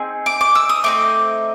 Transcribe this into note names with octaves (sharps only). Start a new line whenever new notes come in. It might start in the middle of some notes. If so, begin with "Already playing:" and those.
Already playing: C4 D#4 G#4
D6
D6
E6
D#6
A3 C4 D#4 D6